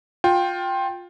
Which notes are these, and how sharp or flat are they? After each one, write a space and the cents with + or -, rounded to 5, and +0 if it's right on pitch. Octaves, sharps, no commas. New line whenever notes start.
F4 +20 G5 +0